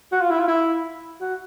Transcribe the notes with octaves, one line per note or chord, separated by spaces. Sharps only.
F#4
F4
E4
F4
E4
F#4